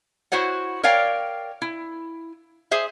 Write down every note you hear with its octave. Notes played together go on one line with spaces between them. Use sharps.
E4 F#4 C5 C#5 F#5
A#4 C#5 D5 F5 G5
E4
G#4 C5 E5